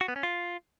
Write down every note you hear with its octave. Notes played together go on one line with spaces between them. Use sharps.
F#4
B3
C#4
F4